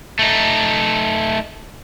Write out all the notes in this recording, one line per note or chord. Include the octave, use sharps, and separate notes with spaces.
A3 D#4